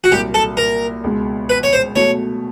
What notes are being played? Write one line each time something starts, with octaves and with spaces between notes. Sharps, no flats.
F#4
C2 A#2 F#3 A#3 G4
A4
A#4
C#2 B2 G#3
B4
C#5
C5
B2 F#3 A3 C#5